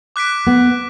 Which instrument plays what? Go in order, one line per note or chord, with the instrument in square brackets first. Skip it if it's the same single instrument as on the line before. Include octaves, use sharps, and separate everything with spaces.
[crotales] D6 F#6 B6 D7
[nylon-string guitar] B3